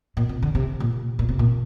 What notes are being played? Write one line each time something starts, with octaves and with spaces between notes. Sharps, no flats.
A#2
C3
D3
C3
A#2
A#2
C3
A#2